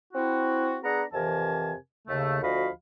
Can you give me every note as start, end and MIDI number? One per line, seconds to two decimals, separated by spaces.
0.14 0.78 60
0.14 0.78 64
0.14 0.78 66
0.83 1.03 59
0.83 1.03 62
0.83 1.03 68
0.83 1.03 78
0.83 1.03 82
1.14 1.74 41
1.14 1.74 48
1.14 1.74 52
1.14 1.74 70
1.14 1.74 80
1.14 1.74 81
2.08 2.38 39
2.08 2.38 49
2.08 2.38 57
2.42 2.70 38
2.42 2.70 53
2.42 2.70 66
2.42 2.70 75
2.42 2.70 77
2.42 2.70 83